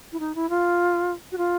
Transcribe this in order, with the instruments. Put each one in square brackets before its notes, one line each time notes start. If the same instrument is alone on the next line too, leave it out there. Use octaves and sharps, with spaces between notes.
[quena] E4
D#4
E4
F4
F#4
F4